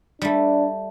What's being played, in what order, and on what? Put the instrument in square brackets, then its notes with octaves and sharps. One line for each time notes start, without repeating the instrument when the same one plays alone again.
[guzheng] G3 A3 [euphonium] D4